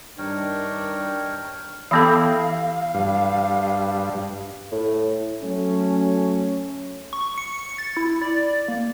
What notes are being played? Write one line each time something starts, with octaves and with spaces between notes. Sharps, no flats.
G2 D#3 D4 A#4 C#5 G5
E3 B3 E4 G4 A4 E5 F5
G2
A2
F#3 A3 C#4
C#6
C#7
A6
E4
D5
A#3